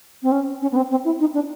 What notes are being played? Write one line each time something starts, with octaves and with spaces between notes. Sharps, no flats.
C4
C#4
C#4
B3
C4
C4
E4
D#4
D4